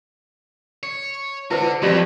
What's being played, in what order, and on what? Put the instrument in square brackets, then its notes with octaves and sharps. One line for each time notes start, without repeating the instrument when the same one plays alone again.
[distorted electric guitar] C#5
[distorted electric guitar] D3 [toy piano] E4 B4 C5
[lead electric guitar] F2 [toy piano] G4 D5 [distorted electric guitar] B4